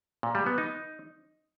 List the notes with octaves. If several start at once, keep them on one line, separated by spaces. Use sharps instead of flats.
A#2
G3
B3
D#4